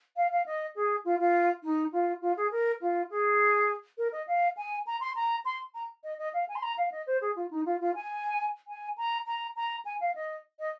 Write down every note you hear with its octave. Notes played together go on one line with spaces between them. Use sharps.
F5
F5
D#5
G#4
F4
F4
D#4
F4
F4
G#4
A#4
F4
G#4
A#4
D#5
F5
G#5
A#5
C6
A#5
C6
A#5
D#5
D#5
F5
G#5
C6
A#5
F5
D#5
C5
G#4
F4
D#4
F4
F4
G#5
G#5
A#5
A#5
A#5
G#5
F5
D#5
D#5